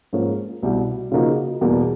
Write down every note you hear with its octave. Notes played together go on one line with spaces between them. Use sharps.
G#2 F3 A#3 C#4
C2 B2 G3
C#3 F3 A#3 D#4 F#4
E2 B2 G3 A#3